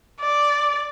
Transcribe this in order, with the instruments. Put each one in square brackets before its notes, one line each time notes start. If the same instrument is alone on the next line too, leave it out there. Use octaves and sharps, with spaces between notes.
[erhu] D5